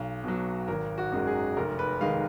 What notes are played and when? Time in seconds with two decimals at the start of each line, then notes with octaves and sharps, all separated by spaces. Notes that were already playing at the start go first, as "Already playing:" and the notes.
Already playing: B1 F5
0.24 B2 F#3
0.68 G#1 A#4
0.98 F#4
1.12 F#2 D#3 G#3
1.27 G#4
1.56 F1 A#4
1.79 B4
2.01 D#3 G#3 F5